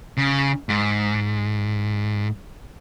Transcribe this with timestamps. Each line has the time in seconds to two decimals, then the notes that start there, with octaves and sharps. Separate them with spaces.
0.17 C#3
0.69 G#2